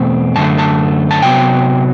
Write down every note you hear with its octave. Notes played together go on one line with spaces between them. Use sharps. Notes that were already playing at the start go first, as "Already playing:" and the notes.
Already playing: E2 B2 A3 C4
F#2 D3 A3 A5
A5
A5
C3 F#3 B3 G5